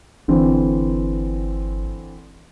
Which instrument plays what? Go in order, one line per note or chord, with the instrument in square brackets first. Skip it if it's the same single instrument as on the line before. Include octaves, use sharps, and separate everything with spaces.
[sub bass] G1 [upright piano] D3 E3 C4